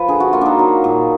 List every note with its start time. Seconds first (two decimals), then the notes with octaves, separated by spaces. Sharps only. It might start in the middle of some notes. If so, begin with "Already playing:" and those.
Already playing: F3 B4
0.08 D3 G#4
0.20 F#4
0.33 A#3 F4
0.41 D4 D#4
0.59 F#3
0.84 A#2